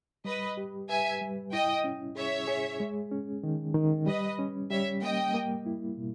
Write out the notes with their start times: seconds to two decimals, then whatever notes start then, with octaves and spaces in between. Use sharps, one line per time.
0.25 G3 B4 D#5
0.57 G4
0.88 B4 E5 G#5
1.21 G3
1.52 E4 D#5 G5
1.84 C#4
2.16 G#4 C#5 E5
2.48 G#4
2.80 G#3
3.12 C#4
3.43 D#3
3.75 D#3
4.06 G3 B4 D#5
4.39 C#4
4.70 G3 C#5 E5
5.02 A#3 D#5 G5
5.34 A#3
5.66 E4
5.97 B2